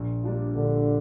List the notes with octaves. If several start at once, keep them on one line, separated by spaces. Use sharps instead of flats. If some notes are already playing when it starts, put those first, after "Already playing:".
Already playing: A#1
A#2 G3 D4 F4
A#1 D3